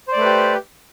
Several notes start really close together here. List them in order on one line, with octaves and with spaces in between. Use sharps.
C5 D5 A3 B4 G4